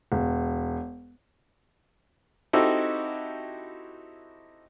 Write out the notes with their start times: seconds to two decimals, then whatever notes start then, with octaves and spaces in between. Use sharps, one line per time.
0.12 E1
2.53 C4 D#4 E4 F#4 G4 A4